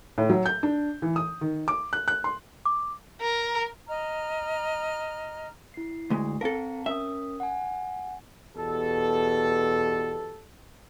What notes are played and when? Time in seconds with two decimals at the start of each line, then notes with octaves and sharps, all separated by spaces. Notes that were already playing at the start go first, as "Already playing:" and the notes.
0.18 A2
0.30 F#3
0.46 G6
0.63 D4
1.02 E3
1.16 D#6
1.41 D#3
1.68 D6
1.93 F#6
2.08 F#6
2.24 C6
2.66 D6
3.22 A#4
3.88 D#5 A#5 F6
5.74 E4 C7
6.10 D2 G#3
6.41 C4 A4 A#4 F5 A5
6.86 C#4 A#4 E5 D#6
7.40 F#5 G#5
8.56 E2 B2 G4 A4